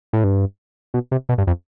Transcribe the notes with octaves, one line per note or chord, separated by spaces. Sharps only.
A2
G2
B2
C3
B2
G2
F2